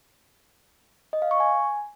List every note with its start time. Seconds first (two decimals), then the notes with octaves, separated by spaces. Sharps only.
1.13 D#5
1.22 F5
1.31 C#6
1.40 G#5